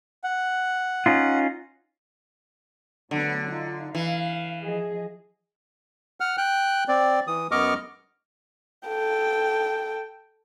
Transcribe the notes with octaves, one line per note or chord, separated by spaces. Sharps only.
F#5
C#4 D#4 F4
D3 F#3 A3 B3
D#4 F4
E3 F5
F3 G#4 D#5
F#5 F6
G5 F#6
C4 D5
E3 D#6
F#2 B3 D#5 C#6 D6 F6
A4 G5